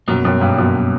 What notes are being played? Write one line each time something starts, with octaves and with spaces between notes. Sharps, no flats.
F#2 B2 F#3 A#3
F#2
G2
F#2